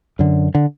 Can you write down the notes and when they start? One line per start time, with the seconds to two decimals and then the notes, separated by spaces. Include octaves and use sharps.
0.19 F#2 D3
0.55 D3